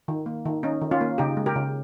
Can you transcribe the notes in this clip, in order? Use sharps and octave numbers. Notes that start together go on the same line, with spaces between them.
D#3
A#3
D#3
C#4 D#4
D#3
C#4 F4
A#3
C#3 D#4 G4
G#3
G4 A#4
C#3